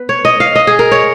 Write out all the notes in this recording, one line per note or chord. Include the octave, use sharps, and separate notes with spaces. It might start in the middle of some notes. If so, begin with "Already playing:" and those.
Already playing: B3 B4
C#5
D#5
F5
D#5
G#4
A#4
C#5